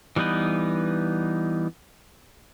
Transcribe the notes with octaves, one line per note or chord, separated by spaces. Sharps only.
E3 G3 B3 D#4 B4